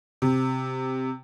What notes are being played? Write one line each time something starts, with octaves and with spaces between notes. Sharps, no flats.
C3